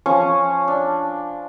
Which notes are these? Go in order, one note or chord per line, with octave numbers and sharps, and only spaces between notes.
F3 C#4 G#5 C#6
D4